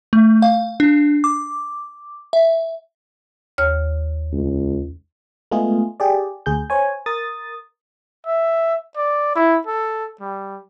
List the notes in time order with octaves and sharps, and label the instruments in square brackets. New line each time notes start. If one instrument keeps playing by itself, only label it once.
[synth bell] A3
F5
D4
D6
E5
[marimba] D#2 C#5 F6
[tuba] C#2
[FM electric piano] G#3 A3 B3 F4 G#4
G4 G#4 D5
D2 G#4 G6
C5 C#5 G#5
A#4 D#6 A6
[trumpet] E5
D5
E4
A4
G3